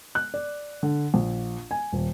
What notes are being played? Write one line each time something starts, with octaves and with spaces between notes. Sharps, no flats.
F#6
D5
D3
A#1
G#5
D#1